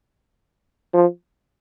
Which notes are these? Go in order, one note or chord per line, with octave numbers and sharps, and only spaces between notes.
F3